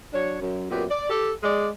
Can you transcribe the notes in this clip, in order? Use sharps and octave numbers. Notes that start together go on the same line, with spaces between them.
F#3 D4 C#5
F#2
F#2 A#2 B3 G4
D5
G4 A4
G#3 D5